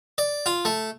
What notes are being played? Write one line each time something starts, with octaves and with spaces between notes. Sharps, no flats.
D5
F4
A3